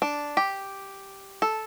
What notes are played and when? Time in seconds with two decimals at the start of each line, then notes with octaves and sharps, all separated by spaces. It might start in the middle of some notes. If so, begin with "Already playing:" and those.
0.02 D4
0.37 G4
1.42 A4